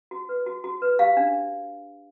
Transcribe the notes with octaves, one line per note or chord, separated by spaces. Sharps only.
F#4
B4
F#4
F#4
B4
G4 F5
D4